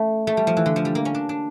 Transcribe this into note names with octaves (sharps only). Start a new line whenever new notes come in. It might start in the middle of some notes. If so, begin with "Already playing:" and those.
Already playing: A3 C#4
A3
G3
F3
E3
D3
F3
G3
A#3
C#4
D4
D4